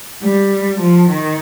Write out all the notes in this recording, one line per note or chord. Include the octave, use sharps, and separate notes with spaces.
G3
F3
D#3